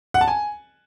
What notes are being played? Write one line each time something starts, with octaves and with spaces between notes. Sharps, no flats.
F#5
A5
G#5